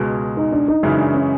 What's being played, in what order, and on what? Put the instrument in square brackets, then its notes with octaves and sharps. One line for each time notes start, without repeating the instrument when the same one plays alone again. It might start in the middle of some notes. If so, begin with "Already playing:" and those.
Already playing: [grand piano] C#2 B2 G#3
[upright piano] D#4
D4
D#4
[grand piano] F#2 C#3 E3 G#3 [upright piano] D#4
[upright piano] D4
C#4